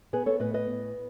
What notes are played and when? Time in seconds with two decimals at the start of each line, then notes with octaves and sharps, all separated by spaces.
0.13 B3 G#4 B4
0.26 A4 C#5
0.39 A2 B4 D#5
0.54 B4 D#5
0.67 B3